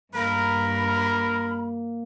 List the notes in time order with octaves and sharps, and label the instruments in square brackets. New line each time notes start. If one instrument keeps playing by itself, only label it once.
[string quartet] G2 [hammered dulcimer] A#3 [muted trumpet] A#4 [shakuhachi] B5